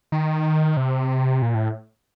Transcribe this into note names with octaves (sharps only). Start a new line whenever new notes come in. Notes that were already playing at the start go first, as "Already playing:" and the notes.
D#3
C3
A#2
A2